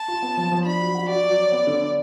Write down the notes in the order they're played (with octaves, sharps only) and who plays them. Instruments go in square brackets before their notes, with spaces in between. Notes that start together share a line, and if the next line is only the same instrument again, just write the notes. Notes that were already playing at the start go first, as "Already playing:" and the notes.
Already playing: [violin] A5
[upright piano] F4
B3
F3
F3
[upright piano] D4 [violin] B5
[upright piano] F#3
F#4
[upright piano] F#4 [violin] D5
[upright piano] F#3
C#5
B3
D3
D4